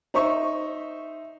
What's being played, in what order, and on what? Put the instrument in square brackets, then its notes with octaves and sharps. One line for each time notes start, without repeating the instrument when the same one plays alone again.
[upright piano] D#4 C5 E5 C#6